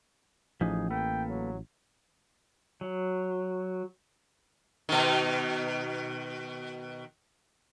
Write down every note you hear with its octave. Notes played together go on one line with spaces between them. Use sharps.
A1 F3 D#4 G#4
A#3 A4 B4 G5
F#3
F#3
B2 D#3